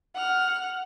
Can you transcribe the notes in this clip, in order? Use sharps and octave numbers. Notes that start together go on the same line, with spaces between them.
F#5 F6